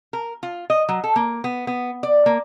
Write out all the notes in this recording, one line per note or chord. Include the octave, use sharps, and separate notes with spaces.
A#4
F4
D#5
F#3
A4
A#3
B3
B3
D5
A#3